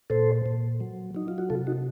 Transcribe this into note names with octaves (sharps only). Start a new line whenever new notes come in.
A#2 A4 C5
A#2
F#3
F#3 D#4
F4
F#4
C3 F4 A4
D#4 F#4